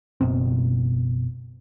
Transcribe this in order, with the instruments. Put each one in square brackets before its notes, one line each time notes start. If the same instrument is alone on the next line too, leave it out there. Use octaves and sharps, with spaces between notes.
[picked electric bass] F#1 B2 C4